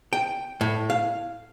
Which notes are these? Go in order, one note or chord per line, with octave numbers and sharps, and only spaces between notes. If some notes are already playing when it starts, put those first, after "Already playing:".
G5
A2
F5